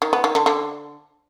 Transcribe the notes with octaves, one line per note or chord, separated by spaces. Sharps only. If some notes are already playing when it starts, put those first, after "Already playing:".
D#3
B3
D#3
D3
D3